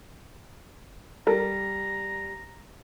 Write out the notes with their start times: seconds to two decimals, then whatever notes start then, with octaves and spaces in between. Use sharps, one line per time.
1.27 G3 A4 A#4 A#5